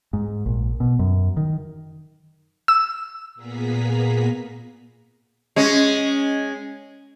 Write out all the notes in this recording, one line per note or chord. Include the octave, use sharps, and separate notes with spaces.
G#2
A#1
B2
F#2
D#3
E6
A#2 A#3 B3 G#4 A#5 B6
G#3 C#4